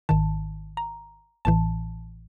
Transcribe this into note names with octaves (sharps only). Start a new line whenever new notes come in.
G#1 G#2 D#3 A5
A#5
A1 A2 E3 A5